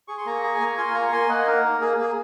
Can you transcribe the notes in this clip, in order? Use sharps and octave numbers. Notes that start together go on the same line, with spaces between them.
G#4 C#6
C6
A#3 A#5 C#6
G#4
G#5
A#3
A#5
F4 G#5 C6
A#3 A#5 C#6
A#3 G#5 C6
A#3 D#5 F#5
D#4 A#4
A#3
A#3 G#4
A#3 G#4